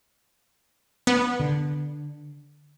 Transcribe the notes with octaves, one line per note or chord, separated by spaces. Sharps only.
B3
D3